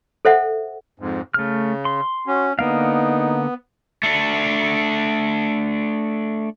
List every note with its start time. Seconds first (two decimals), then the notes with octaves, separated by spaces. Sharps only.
0.25 A4 C5 E5 F#5
1.00 F2 G#2
1.34 C#3 A3 F6
1.85 C6
2.27 C#4 F#4
2.59 D3 A#3 B3 D#4 F5
4.03 A3 D4